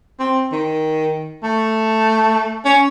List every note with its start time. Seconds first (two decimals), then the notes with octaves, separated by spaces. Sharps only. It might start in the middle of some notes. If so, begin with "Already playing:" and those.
0.19 C4
0.52 D#3
1.43 A3
2.65 C#4